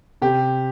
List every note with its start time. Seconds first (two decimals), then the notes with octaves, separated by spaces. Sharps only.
0.22 C3 G4